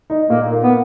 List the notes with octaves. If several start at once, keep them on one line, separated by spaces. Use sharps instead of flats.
D#4
A#2 A#3
A#3
B3